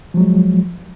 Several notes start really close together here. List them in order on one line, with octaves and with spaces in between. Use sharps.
F3 F#3 G#3